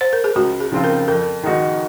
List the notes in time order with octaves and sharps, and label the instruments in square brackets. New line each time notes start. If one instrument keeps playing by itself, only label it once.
[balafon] C5
A#4
G#4
[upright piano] C#2 [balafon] F#4
[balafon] G#4
[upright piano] C#3 F3 C4 F4
[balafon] A#4
[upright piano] F2 [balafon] A#4
[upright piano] D#3 G#3 D#4 F#4